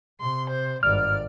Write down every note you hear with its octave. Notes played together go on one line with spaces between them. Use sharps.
C3 C6
C5
G#1 G2 D5 F6